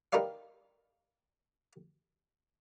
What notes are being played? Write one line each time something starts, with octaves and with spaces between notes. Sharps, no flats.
D#4 G4 A#4 B4 D5 F5